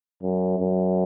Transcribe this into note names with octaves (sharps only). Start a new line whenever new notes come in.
F#2
F#2